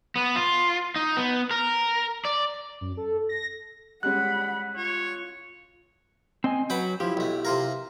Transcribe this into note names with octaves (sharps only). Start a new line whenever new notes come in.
B3
F4
D#4
B3
A#4
D5
F#2
A4
A#6
G3 G#3 C#4 F#5 B5 F#6
F4 C#5
C4 D#5 G#5
F#3 B4 F#5 G5
F3 E4 G4
B1 A3
C3 F4 A#4